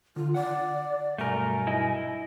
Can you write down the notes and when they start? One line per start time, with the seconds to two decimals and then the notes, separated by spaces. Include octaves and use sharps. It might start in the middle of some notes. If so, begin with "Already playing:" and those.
0.16 D3 F4
0.34 D5 F#5
1.18 B1 G2 A3 A#4 G#5
1.67 E4 D#5